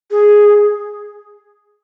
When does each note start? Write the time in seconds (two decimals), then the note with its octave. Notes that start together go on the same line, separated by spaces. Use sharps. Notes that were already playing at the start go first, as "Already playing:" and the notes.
0.11 G#4